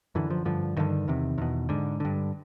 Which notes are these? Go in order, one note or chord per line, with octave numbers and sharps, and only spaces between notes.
F#2 D3 E3
F3
G2 D3 F3
G2 D3 D#3
E2 C3
E2 B2
G#2 D3
G2 D3